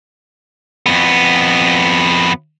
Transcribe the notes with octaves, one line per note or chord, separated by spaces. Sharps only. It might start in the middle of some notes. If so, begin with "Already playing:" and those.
F2 B3